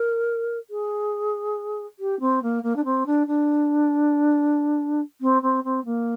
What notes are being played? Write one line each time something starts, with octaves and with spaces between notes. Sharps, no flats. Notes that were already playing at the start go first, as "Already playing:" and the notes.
Already playing: A#4
G#4
G4
C4
A#3
A#3
D4
C4
D4
D4
C4
C4
C4
A#3